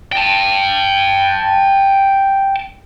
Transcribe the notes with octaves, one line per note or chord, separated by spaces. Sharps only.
G5 A5